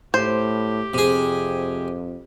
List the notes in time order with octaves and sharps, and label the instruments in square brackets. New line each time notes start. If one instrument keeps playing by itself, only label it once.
[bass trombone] A2 [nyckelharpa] G4 [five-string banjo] C5
[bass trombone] F2 [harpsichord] C3 G#4